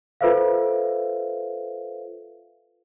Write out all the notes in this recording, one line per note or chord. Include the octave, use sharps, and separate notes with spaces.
F4 A4 B4 C5 E5 F5